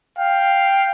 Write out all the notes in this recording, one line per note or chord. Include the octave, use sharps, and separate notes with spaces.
F5 G5